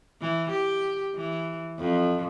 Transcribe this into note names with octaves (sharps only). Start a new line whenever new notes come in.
E3
G4
E3
F2